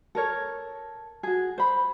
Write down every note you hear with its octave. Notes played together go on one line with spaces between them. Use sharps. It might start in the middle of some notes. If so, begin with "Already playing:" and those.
A4 A#4 C#5
F#4 G#4
C5 B5